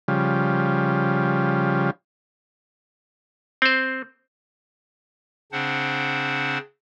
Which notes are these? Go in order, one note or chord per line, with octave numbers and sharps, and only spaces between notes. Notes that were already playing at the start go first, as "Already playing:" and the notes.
C#3 F3 G3
C4 C5
C#3 C4 D4 C5 F#5